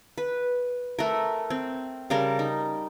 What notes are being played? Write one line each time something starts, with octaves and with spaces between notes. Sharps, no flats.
B4
A3 A#4
C4
C#3 G3 A#4 A5
D#4